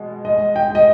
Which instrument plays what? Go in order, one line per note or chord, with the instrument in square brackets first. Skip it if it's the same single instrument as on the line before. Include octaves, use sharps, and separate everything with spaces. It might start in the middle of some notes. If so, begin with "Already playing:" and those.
Already playing: [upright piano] B2 G#3
[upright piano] G#3 [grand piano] D#5
[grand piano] G5
[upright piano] G#3 [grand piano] D#5